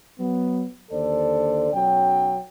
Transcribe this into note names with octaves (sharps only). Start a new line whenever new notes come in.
F#3 B3
D#2 D3 A4 C5 D5
B1 F#3 C#4 G5